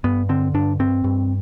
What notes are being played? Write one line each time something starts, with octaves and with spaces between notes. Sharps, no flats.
G2 B3
D3 C4
G2 D4
G2 C4
G2